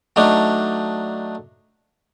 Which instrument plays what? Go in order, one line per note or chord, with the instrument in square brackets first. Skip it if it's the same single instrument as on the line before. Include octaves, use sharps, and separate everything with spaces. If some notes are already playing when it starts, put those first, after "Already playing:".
[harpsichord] F#3 A3 D4 D#4